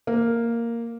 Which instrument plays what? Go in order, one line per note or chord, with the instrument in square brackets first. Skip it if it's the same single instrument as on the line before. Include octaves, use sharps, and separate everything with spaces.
[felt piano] A#3